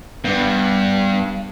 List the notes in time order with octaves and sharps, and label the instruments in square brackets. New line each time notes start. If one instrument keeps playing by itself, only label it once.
[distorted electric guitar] G2 [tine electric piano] B3